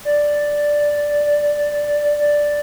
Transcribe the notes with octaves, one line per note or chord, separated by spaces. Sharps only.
D5
D5